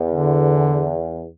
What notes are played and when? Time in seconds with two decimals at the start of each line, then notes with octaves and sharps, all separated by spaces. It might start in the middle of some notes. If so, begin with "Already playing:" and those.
Already playing: E2
0.12 D3